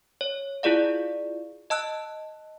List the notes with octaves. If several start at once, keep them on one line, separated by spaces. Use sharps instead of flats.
C#5
E4 F4 G#4 D5 F5
D#5 A5 E6 F#6